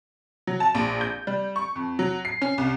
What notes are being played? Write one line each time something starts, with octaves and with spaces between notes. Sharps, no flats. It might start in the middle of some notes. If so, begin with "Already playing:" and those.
F#3
A5
A#1
G6
G3
C#6
F2
F#3
C7
C#4
C2